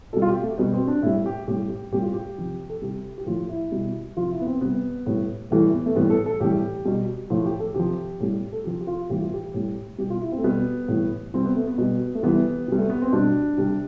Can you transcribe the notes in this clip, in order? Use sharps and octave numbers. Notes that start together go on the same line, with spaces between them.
B2 G3 A4
F4
G4
A3
B2 G3 B3
C4
D4
A2 G3 E4
G4
A2 G3 G4
G4
A2 G3 G4
F4
G4
C3 F3
A4
C3 G3 G4
G4
A2 F3 F4
E4
B2 G3
C3 F3 F4
E4
B3
C4
C3 G3 B3
A2 G3
A2 E3 G3 A3
B3
A3
A2 E3 G3 B3
A4
A4
A2 E3 G3 G4
B2 G3
A2 F3 F4
G4
A4
C3 F3 G4
A2 G3
A4
C3 F3 G4
G4
F4
A2 E3 G3 G4
F4
G4
A2 G3
B2 G3 G4
F4
E4
C4
A3
B2 G3 B3
A2 E3 G3
C3 G3 C4
B3
A3
B3
B2 G3
A3
C3 E3 G3 B3
C3 G3
A3
B3
C4
B2 G3 D4
C3 G3